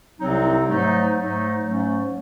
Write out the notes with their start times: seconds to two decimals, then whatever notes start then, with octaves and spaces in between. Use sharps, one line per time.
0.20 C2 C3 F#3 C4 D#4
0.69 G#2 F#3 A3 D#4
1.17 G#2 F#3 A3 D#4
1.65 G#2 F#3 A3 C#4